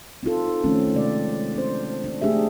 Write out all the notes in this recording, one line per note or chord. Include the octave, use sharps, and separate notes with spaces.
C4 D#4 F4 A4
D#3 F3 A3 C4 C#4
C3 G#3 D5
C4 D4 C5
D4
A3 D4 G4 G#4 E5